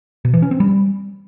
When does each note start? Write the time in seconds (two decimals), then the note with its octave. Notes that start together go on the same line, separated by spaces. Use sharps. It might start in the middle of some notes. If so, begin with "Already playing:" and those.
0.25 B2
0.33 E3
0.42 C#4
0.51 C4
0.60 G3